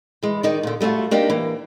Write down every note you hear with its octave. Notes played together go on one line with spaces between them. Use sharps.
E3 G#3
D#3 D#4 D5
A#2 D3
G3 A3 D#4 F4 F#4
A#3 D4 D#4 G4
E3 A#3